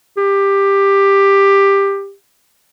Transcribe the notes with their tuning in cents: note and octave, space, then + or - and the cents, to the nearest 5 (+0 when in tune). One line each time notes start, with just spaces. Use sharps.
G4 +15